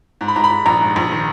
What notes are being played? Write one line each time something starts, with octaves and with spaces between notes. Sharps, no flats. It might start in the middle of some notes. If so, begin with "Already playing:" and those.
G#2
B5
G#2 A#5
B5
G#2
A#1 A#5
G#2
A#1
D#3